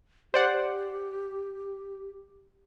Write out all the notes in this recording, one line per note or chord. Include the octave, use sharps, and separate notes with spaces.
G4 C5 D5 F#5